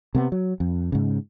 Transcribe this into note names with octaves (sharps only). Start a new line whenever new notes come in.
C3 A#3 B3
F#3
F2
G#2 C#3